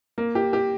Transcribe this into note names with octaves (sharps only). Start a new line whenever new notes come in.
A#3
G4
G4